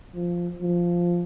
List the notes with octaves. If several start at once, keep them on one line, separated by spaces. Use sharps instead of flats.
F3
F3